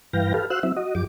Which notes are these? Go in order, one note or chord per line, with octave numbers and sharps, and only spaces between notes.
G2 E3 B4 F5 G5 A#6
G4 A4 B4 F5
F#4 C5 F5 E6 F#6
F#3 C4 E4 E5
F#4 D#5
F#2 F3 G4 D6